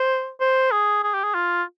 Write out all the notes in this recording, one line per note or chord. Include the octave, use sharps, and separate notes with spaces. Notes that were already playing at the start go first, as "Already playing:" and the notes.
Already playing: C5
C5
G#4
G#4
G4
G#4
F4